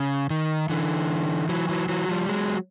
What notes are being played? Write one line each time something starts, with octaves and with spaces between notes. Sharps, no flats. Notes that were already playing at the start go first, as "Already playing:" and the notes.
Already playing: C#3
D#3
D3 E3
E3 F#3
E3 F#3
E3 F#3
F3 G3
F#3 G#3